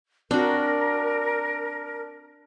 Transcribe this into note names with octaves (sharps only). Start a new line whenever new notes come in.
C4 D4 F#4 A#4